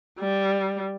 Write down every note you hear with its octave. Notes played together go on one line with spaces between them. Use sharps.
G3